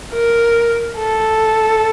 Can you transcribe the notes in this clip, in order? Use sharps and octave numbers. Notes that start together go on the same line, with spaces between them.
A#4
A4